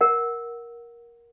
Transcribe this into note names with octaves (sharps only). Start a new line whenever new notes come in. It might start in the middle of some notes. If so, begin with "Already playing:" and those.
A#4 F#5